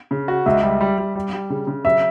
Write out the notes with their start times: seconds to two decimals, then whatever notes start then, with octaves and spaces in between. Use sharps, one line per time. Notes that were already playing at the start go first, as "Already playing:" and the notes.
0.11 C#3
0.28 F#4
0.46 C#2 E5
0.63 G3
0.81 G3
0.98 G3
1.15 G3
1.33 G3
1.50 C#3
1.67 C#3
1.85 F#3 E5